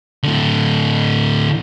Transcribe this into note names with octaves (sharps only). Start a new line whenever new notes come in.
A2 D3